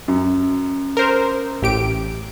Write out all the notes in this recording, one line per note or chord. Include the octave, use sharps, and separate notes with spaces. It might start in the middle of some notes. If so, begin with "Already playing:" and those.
F#2
A#4 C5
A1 G4 D7